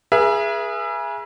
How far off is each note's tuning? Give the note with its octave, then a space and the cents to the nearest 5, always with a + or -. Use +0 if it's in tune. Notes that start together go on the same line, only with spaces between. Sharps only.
G#4 +0 B4 -45 E5 +30